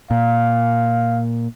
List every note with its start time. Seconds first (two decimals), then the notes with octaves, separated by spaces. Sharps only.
0.11 A#2 F5